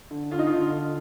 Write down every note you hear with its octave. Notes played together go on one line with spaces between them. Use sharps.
D3
D3 F4
D#4
F4
D3
D3